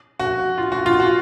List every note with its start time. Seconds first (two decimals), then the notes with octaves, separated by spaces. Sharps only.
0.20 F#4
0.58 F4
0.72 F#4
0.86 F4
1.00 F#4